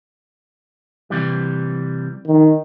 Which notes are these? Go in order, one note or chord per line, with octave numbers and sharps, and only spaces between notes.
C3 E3 G3
D#3